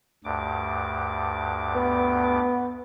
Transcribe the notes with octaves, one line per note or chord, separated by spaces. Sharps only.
D2 G2 D6
B3